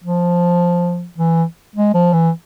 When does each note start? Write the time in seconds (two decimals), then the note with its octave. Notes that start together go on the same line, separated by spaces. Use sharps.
0.04 F3
1.18 E3
1.75 G#3
1.94 F3
2.13 E3